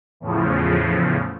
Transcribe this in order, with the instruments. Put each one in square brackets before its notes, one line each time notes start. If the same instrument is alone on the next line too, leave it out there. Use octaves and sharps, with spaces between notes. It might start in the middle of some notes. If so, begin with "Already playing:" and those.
[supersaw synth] E2 A2 C#3 F3